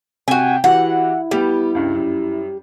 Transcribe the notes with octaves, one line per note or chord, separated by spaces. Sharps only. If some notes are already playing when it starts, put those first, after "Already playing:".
C3 F#4 G5 G#5
E3 E4 F#4 G4 F#5
G3 B3 G4
C#2 G2
F#2